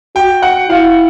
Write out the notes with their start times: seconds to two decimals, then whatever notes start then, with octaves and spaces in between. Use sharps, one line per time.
0.16 F#4 G5
0.42 F#5
0.69 E4 F5